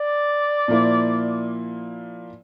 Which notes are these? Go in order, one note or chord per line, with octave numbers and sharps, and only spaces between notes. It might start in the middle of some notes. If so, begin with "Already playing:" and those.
Already playing: D5
A#2 F3 A#3 E4